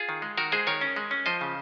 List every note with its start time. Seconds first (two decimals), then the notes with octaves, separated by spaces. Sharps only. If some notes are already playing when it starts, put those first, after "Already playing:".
Already playing: F4 G#4
0.09 D#3
0.22 G#3
0.37 D#3 F#4 A#4
0.52 G#3 G#4 C5
0.67 D#3 A#4 C#5
0.81 C#4
0.96 G#3
1.11 C#4
1.26 F3 C5 D#5
1.41 C#3